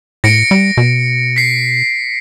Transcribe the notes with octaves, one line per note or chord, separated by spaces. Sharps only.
A2 A#6 C#7 D7
G3
B2
B6 C7